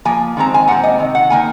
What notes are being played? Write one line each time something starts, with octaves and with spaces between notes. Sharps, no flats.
F3 A#3 G#5
D#3 G#3 C4 A#5
G#5
A#2 G#3 C4 F#5
D#5
C3 D#3
F#5
D#3 A#3 G#5